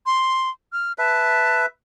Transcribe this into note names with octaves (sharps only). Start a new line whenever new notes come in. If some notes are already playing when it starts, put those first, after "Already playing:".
C6
F6
B4 E5 A5